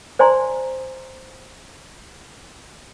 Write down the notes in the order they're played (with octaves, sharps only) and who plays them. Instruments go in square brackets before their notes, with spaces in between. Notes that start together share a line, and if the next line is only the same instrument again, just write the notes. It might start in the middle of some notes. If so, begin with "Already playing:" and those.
[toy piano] C5 D5 G#5 A#5 C6